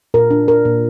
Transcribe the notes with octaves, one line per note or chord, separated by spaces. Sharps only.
A#2 A#4
D4
D4 A#4
A#2